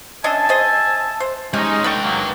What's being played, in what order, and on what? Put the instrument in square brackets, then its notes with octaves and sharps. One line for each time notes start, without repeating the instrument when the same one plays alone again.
[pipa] C#4 D4 D#5 [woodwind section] E5 G#5 A5
[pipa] G#4 C5 D#5
C5
[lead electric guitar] G#3 [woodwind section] C#4 D#4 [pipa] G4
[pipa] D3 A4 C#6 [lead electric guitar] B4 G5
[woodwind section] F#3 A#3